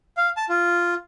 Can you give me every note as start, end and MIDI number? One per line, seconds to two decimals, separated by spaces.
0.17 0.29 77
0.37 0.45 81
0.49 0.94 65